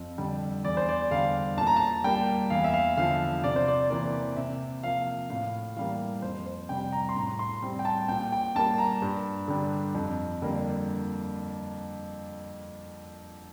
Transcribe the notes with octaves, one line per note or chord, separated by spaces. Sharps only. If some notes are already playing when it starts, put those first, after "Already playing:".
Already playing: F2
D3 G3
E2 D5
C5
D5
D3 G3 F5
A#2 A5
A#5
A5
G3 A#3 G5
E2 F5
E5
F5
D3 F3 F5
C3 D5
C5
D5
E3 A#3 D5
C3 E5
F3 A#3 F5
A2 F5
E3 G3 A#3 F5
F2 C5
C5
C3 G3 G5
A#5
C6
A2 A#5
C6
G3 C4
G5
A5
A#2 G5
G5
G3 A#3 A5
A#5
G2
D3 G3
F2
D3 G3 A#3